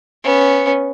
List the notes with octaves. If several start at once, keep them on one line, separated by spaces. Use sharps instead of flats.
B3 C#4